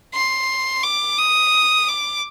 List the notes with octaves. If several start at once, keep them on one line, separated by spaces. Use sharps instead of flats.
C6
D6
D#6
D6